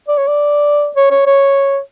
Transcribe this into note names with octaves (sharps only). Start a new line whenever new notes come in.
D5
C#5
D5
C#5
C#5
C#5